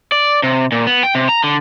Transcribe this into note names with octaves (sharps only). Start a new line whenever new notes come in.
D5
C3
A#2
B3
G5
C3
A#5
D3